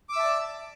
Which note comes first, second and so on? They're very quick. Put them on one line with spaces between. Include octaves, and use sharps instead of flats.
D6 E6 E5 A5 D5